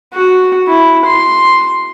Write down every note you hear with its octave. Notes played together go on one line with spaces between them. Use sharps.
F#4
E4
C6